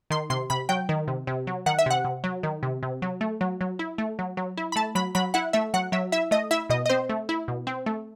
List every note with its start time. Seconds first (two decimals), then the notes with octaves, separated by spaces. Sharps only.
0.10 D#3 C6
0.30 C3 C6
0.50 C3 B5
0.69 F#3 G5
0.89 D#3
1.08 C3
1.27 C3
1.47 F#3
1.66 D#3 F#5
1.79 E5
1.86 C3 F#5
2.04 C3
2.24 F#3
2.43 D#3
2.63 C3
2.83 C3
3.02 F#3
3.21 A3
3.41 F#3
3.61 F#3
3.79 E4
3.98 A3
4.19 F#3
4.37 F#3
4.57 E4
4.72 B5
4.76 A3 A5
4.95 F#3 B5
5.15 F#3 B5
5.34 E4 F#5
5.53 A3 E5
5.74 F#3 F#5
5.92 F#3 E5
6.12 E4 E5
6.31 A3 D#5
6.51 E4 E5
6.70 B2 D#5
6.86 D#5
6.89 C4 C5
7.09 A3
7.29 E4
7.48 B2
7.67 C4
7.86 A3